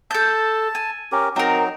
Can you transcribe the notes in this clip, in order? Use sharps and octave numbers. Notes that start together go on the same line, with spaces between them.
A4 A5 G6
G#5
C#4 G4 A#4
F#3 C4 D#4 A#4